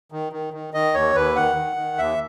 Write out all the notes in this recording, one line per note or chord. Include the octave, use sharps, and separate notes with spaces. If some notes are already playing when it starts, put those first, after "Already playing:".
D#3
D#3
D#3
D#3 D#5
D#2 C#5
D#2 B4
D#3 F#5
D#3
D#3
D#2 E5